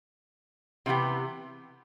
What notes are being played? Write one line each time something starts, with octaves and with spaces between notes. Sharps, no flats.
C3 E3 B3 E4 G4